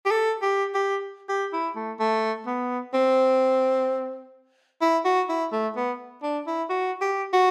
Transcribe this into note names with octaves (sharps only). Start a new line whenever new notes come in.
G4
A4
G4
G4
G4
E4
A3
A3
B3
C4
E4
F#4
E4
A3
B3
D4
E4
F#4
G4
F#4